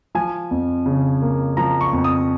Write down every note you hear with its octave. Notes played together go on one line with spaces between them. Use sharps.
F3 G#5
F2
C#3
A#3
F3 A#5
C#6
F2
D#6